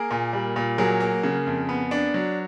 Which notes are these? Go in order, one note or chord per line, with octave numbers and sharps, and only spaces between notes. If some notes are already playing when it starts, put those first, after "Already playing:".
Already playing: A#3 G#4 A#4
A#2
G3
A#2
F#3 G#4 A#4
A#3
C#3
F2
B3
D4
F#3